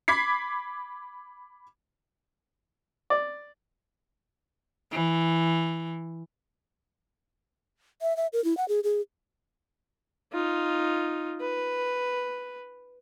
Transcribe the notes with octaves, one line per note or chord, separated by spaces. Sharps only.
B5 D6 G#6 B6 C7
D5
E3
E5
E5
A#4
E4
F#5
G#4
G#4
D#4 F4
B4